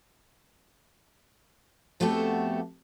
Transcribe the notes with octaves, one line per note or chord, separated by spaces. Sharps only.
F2 A3 B3 F#4 G4 A4